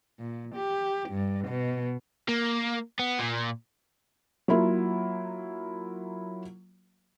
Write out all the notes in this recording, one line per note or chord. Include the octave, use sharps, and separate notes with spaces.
A#2
G4
G2
B2
A#3
B3
A#2
F#3 A#3 E4 F4